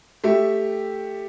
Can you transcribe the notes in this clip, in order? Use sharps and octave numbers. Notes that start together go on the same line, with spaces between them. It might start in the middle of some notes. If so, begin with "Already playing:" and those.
A3 G4 E5